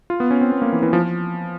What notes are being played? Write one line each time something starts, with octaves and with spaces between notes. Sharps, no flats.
F4
B3
C#4
C4
B3
A#3
E3
E3
F3